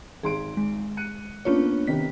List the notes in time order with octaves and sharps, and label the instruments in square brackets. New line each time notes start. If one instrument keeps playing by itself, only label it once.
[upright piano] G#1 C6 D7 [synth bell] G#4
[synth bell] G#3
[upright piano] F#6 C#7 D#7
[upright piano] A#3 B3 D4 [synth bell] C#4 F4 C#5
[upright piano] C3 D#3 B3 [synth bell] B6